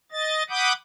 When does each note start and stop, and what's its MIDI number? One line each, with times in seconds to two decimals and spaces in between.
0.12 0.43 75
0.12 0.43 93
0.50 0.73 78
0.50 0.73 83
0.50 0.73 86
0.50 0.73 87
0.50 0.73 91